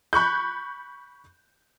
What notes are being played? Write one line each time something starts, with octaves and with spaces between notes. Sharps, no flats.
B5 C#6 F#6 G6